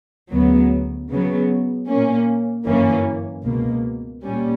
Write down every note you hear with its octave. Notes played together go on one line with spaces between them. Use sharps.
D2 C#3 F#3 B3
C#3 F#3 B3
A#2 A#3 C#4
G1 F#2 E3 A#3 C#4
C#2 B2 A#3
A#2 G3 C#4